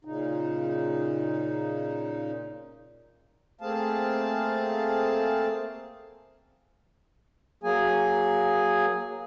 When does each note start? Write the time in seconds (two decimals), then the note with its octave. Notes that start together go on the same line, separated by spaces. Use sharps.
0.05 A#2 C#3 D#4
3.61 A3 A#3 C4 G#4 F5 A5
7.63 F#3 A#3 G#4 G#5